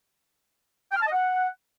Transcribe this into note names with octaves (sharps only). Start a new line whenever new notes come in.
G5
F6
A5
D#5
F#5